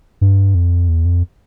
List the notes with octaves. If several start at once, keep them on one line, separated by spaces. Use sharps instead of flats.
G2
F2
E2
F2